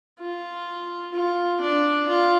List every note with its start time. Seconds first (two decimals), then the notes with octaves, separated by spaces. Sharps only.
0.20 F4
1.14 F4
1.61 D4
2.08 F4